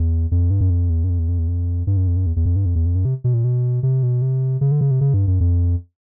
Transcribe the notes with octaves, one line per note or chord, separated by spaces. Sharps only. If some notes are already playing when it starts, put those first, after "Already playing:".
Already playing: E2
F2
G2
F#2
F2
E2
F#2
F2
E2
F2
E2
F2
G2
F#2
F2
F#2
E2
E2
F2
G2
F2
E2
F2
F#2
C3
B2
A#2
B2
C3
B2
C3
C#3
D3
C#3
C3
C#3
G2
F#2
F2